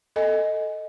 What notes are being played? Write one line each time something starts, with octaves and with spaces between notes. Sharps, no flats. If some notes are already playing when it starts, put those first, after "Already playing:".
A4 D#5 G#5